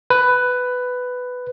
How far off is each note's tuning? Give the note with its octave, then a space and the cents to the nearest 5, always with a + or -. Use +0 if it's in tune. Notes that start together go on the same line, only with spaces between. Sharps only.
B4 +10